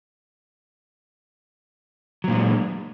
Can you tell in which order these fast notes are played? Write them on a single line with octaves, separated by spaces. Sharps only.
F#3 A#2 G#3